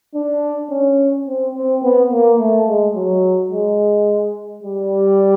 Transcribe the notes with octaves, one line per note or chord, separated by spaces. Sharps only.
D4
C#4
C4
C4
B3
A#3
A3
G#3
F#3
G#3
G3